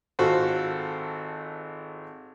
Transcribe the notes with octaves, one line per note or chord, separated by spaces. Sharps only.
G#1 F4 F#4 A4 C5